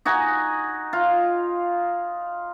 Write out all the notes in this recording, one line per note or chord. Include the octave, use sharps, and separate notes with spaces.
D#4 F#4 G#5
F4